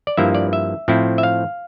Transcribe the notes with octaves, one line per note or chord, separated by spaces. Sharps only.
D5
G2 F3 A#3 E4 E5
D5
E5
A2 F3 C4 E4
E5
F5